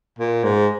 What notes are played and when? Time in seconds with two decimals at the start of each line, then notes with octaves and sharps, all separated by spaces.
0.18 A#2
0.44 G#2